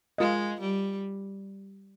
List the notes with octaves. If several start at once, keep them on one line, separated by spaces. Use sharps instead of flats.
G#3 F4 A#4 D#5
G3